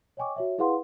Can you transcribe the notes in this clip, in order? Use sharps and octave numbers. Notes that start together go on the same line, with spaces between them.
C#5 D#5 G5 G#5 C#6 D6
F#4 C#5 E5
E4 G#4 B4 F5 F#5 C6